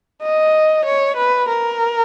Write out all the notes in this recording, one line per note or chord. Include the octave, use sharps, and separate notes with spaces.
D#5
C#5
B4
A#4